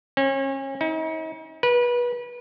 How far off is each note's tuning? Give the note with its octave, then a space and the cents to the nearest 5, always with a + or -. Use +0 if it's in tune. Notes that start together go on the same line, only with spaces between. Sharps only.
C#4 -35
D#4 +45
B4 -30